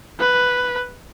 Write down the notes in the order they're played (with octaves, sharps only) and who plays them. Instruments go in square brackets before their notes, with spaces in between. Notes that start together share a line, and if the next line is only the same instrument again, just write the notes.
[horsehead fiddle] B4